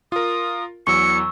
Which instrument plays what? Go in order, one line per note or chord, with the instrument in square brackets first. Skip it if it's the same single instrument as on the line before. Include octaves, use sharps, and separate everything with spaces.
[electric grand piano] F4 A#4 [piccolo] D#6
[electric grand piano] E2 E3 F#3 [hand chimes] C#6 E6 [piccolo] C#7